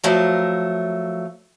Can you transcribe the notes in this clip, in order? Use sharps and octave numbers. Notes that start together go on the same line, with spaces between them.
F3 F#3 A3 A#4